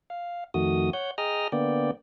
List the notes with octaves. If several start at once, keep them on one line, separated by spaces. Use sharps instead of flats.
F5
F2 D#3 A3 F#4 D#6
C#5 F#5 G6
G#4 D#5 G5 A#5 D#6 F6
D3 A#3 B3 D5 G5